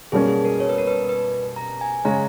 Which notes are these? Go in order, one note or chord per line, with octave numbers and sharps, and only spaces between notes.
B2 G3 A#3 C#4 G#4
G#4
A#4
C#5
B4
A#4
B4
B4
A#5
G#5
C#3 G#3 C#4 A#5